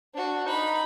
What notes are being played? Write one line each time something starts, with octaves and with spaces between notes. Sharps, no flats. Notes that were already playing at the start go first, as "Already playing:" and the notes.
D4 F#4
D#4 B5